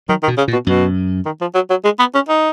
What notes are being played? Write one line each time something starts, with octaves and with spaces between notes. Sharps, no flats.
D#3 F#3
D#3
B2
C#3
A#2
B2
F#2 B2
D#3
F3
F#3
F#3
G#3
B3
C#4
D#4